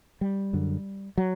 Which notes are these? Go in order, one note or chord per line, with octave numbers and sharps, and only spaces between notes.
G3
F#2 D3
F#3